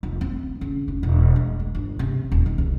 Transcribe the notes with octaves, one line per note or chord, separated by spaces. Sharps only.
F1
C4
C#3
F1
E1
G#3
G#3
G1
C3
D#1
D#3
C2